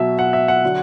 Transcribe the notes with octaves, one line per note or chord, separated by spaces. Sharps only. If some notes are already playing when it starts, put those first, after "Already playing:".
Already playing: B2 F#3 E5
F#5
E5
F#5
D3 F#3